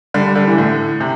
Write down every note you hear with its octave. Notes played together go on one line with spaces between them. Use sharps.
D3 G3
D3 G3
E3
A2 D3
C3